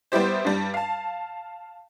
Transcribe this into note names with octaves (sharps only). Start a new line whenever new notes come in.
G3 B3 E4 G4 C5
G2 G3
F5 A5